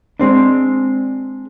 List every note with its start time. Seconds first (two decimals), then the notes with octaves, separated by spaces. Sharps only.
0.20 G#3 C4 D4